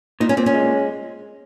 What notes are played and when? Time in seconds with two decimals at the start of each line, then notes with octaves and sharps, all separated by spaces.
0.20 A#2 D#4
0.29 C#4
0.37 A#2 C4
0.46 C#4
0.54 G#3